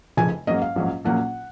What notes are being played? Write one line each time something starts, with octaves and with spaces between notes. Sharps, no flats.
F1 F2 C#3 F3 G#5
G#2 F#3 A#3 C#4 D#5
F5
A#1 G#2 F#3 C#4
A#1 A#2 F#3 A#3 C#4 F#5